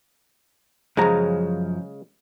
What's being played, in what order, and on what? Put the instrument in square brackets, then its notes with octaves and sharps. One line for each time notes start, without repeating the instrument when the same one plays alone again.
[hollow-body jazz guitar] F#2 F3 A#5 [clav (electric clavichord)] C#3 G#3